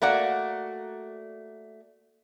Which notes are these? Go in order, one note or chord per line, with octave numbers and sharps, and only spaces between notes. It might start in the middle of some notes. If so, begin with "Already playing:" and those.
A3 A#3 F#4 D5 F#5